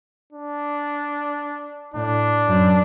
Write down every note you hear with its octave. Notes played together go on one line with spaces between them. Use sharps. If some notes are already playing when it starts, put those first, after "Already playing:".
D4
A2 D4
F#2